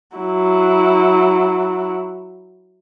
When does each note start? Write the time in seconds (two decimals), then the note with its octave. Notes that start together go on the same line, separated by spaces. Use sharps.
0.16 F#3 E4